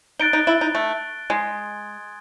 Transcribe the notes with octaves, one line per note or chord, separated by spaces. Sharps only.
D#4 F#6 A6 D7 G7
D#4
E4
D#4
A3
G#3 G#5 C6 D#6 G#6